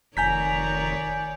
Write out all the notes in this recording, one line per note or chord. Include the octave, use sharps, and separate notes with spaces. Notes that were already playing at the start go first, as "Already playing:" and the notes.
F1 D#3 C#5 D5 G#5 A#5 G6 B6